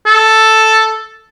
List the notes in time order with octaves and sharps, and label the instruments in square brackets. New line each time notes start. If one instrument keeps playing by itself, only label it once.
[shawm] A4